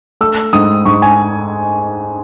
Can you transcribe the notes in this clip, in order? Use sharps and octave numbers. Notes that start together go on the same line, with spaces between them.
A3 E6
G#2 D#6
G#2 C#6
G#5